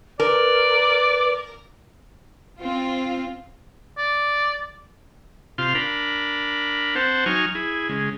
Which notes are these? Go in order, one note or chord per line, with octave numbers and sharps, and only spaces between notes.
A#4 B4 D5
C4 F4
D5
C3 F4 F5 C6
D4 A#4 B5
C4 C5 F#5 A5
F#3 D#4 G#5 C#6 F6
E4 G#4
C#3 G#3